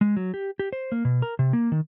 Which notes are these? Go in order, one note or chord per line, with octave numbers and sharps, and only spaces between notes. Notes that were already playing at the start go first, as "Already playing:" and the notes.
G#3
F#3
G4
G4
C5
A#3
B2
A#4
C3
A#3
D#3